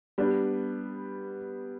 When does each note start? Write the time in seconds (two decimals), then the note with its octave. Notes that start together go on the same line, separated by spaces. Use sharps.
0.18 G3 B3 D4